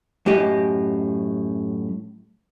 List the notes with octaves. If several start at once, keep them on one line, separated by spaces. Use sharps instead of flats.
F#2 A2 G4 D#5